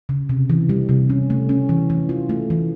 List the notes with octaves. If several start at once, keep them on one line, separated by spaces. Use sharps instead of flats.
C#3
C3
E3
G3
C3
C#4
A3
C#4
E3
E3
F4
A3
E3